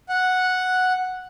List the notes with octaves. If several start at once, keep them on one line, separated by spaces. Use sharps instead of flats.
F#5